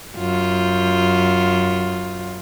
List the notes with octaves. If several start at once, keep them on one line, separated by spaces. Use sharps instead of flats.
F#2 F4